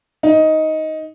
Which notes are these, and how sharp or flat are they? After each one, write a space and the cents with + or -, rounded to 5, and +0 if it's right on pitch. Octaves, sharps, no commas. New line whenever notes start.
D#4 +10